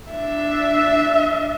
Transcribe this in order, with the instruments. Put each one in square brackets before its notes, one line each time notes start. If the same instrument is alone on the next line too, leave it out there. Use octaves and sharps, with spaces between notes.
[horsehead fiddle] D4 E5